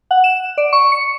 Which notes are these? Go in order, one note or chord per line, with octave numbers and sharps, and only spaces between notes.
F#5
E7
D5
C#6
C#7